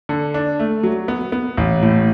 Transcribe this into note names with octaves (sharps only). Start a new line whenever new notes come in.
D3
D4
A3
F#3
B3
B3
A1
A2